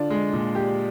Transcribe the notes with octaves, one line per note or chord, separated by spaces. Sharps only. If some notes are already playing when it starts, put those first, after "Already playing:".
Already playing: D3 D4 F4
G#3
A#2
G4